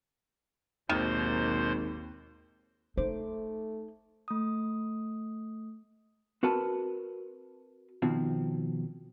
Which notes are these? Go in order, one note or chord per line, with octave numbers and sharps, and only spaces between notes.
G#1 D#2 B2 D#3 C5 C6
A3 D#4 C5 D6
A3 D#6
C4 F#4 A#4 B4 A5
B2 D#3 F3 C4